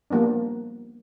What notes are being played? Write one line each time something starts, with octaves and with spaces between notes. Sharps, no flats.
F3 G3 A#3 B3 D4